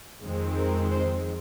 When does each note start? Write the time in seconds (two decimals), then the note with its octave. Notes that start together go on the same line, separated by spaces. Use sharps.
0.24 F2 D#3 G#3 C4
0.57 A#4
0.91 C5